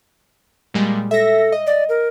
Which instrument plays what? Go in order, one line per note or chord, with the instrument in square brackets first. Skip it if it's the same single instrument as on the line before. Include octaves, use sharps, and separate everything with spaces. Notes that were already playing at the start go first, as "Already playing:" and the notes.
[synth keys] A#2 G3 G#3
[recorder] A4 [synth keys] E5 A#6
[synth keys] D#5
[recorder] D5
A#4